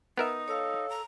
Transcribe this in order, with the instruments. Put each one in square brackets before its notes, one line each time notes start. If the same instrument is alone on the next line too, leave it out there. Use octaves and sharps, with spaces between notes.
[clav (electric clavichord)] B3 A#4 E5 [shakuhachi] D#4
[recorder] A4 [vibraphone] C#5 F5
[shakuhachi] A#5